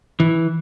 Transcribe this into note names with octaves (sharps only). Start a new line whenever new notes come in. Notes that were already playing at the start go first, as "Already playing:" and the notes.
E3